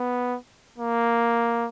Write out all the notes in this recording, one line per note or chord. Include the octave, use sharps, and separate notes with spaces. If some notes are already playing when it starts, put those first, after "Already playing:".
Already playing: B3
A#3